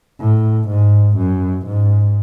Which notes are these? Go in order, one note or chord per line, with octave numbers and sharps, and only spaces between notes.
A2
G#2
F#2
G#2